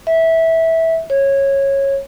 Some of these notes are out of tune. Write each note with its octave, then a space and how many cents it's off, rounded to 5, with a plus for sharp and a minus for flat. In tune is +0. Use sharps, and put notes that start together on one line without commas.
E5 -15
C#5 -15